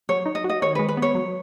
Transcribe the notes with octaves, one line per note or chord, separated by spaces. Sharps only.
F#3 C#5
D#4
D#5
F#4
D#5
D#3 C#5
G#3 B4
B4
B3 C#5
F#3